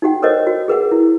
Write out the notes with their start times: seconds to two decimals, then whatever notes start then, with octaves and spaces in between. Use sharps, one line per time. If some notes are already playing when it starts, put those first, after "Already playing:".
0.02 D#4 F#4 G4 F#5 G5
0.22 A4 A#4 C5 C#5 D#5 F#5
0.47 F#4
0.68 G#4 A#4 B4 F#5
0.91 E4